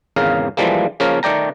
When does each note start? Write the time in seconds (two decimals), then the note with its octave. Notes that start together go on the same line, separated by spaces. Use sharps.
0.16 G#1 E2 C#3 A#4 F5
0.57 E3 F3 G3 G#3 A#3
1.00 C#3 F3 A#3 C#4 A#4
1.23 D#3 A3 D5 G5 A#5